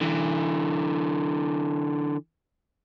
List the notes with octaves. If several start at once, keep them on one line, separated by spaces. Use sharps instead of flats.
D3 E3